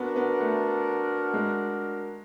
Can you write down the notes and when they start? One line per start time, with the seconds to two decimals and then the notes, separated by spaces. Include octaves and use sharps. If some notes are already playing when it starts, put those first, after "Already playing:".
Already playing: B3 D4 F#4 A#4
0.16 B3
0.40 A3
1.34 G#3